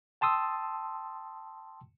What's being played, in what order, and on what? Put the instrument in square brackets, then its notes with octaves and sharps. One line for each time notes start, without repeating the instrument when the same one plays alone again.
[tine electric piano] G5 A5 C6 D#6 E6